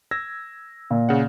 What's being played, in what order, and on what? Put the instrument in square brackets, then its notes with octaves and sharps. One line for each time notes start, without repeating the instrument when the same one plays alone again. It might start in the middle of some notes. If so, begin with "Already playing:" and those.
[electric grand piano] E6 G#6 A#6
[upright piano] A#2
[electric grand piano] C#3 F#5